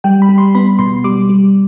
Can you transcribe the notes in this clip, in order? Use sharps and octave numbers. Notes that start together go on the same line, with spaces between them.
G3 G5
B5
G3
C6
B3 B5
B2 C6
G3 D6
G3